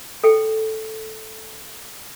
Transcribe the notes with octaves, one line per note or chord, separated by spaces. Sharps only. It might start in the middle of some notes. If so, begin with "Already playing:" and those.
A4 G5